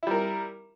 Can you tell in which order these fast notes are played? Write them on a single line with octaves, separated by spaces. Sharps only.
E4 G3 A#4